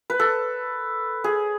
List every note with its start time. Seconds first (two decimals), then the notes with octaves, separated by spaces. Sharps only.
0.10 B4
0.20 A4
1.24 G#4